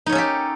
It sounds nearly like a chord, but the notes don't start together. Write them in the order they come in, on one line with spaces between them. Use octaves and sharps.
D#4 C#5 C#4 A4 G4